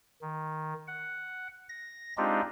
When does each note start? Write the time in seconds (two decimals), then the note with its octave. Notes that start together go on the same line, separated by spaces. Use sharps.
0.22 D#3
0.88 F#5
1.69 A#6
2.18 G#3 C4 D4 D#4 F4 G4